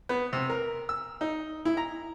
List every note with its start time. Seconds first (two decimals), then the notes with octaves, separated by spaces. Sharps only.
0.09 B3
0.33 C3
0.50 A#4
0.89 E6
1.21 D#4
1.65 E4
1.77 A#5